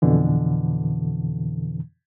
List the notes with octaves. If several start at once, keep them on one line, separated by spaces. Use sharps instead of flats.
F2 B2 D3 E3